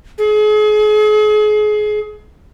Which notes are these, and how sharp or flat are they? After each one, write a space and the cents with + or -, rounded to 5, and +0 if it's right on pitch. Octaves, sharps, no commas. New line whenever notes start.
G#4 +35